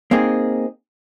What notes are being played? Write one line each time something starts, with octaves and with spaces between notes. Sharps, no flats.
A#3 C4 D#4 G#4